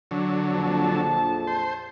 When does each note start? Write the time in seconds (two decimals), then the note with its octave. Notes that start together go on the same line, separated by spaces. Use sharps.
0.11 D3 F#3
0.50 A#1 F2 A5
1.47 C5